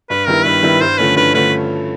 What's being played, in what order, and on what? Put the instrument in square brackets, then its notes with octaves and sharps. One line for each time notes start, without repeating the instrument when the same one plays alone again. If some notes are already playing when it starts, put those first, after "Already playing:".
[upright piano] G2 [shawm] B4
[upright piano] D#3 G3 B3 E4 [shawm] A#4
[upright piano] G2 [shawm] B4
[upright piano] D#3 G3 B3 E4
[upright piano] G2 [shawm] C5
[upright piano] D3 F3 A3 C#4 [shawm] B4
[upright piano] G2 [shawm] B4
[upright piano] D3 F3 A3 C#4 [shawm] B4